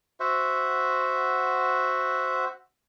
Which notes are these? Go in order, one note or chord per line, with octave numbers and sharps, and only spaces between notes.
F#4 C5 E5 F#5